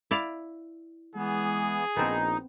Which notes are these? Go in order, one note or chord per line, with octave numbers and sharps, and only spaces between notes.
E4 D5 F5
E3 G#3 B3 G#4
A#1 B3 C4 D#4